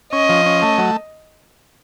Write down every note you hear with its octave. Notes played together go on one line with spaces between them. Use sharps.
C#4 D#5
F3
C#4
A3
F#3